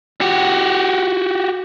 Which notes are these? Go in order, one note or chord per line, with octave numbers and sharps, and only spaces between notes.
F#4 G4